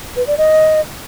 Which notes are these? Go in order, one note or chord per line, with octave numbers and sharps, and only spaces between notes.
B4
D5
D#5